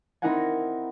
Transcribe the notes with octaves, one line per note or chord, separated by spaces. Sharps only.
C4 D#4 E4 A#4 F#5 G#5